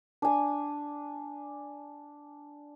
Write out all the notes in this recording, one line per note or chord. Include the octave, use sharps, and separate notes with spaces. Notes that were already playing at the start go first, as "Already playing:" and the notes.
D4 G#5